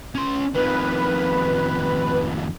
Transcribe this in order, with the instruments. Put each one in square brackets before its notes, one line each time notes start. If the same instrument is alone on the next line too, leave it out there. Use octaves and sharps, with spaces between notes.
[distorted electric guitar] C#4 C6
[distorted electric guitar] F2 D#3 [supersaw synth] B4